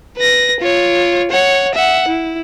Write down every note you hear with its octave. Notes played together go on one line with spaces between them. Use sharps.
B4 A#6
F4 C#5
C#5 F#5
E5 F#5
E4